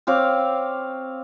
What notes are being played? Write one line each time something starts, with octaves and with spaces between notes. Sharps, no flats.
C4 C#5 F5 D6